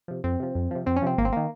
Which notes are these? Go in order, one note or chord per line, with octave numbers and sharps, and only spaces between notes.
C3 F3
F2 C4
C3 F3
F2
C3 F3
F2 C4
C#4
C3 F3 C4
G#1 A#3
C4
D#3 A#3